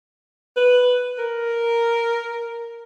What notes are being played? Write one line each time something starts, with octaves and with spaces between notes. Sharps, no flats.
B4
A#4